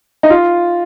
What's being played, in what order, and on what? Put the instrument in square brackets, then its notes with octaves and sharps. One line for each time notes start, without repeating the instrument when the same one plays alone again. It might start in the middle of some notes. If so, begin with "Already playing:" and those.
[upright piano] D#4
F4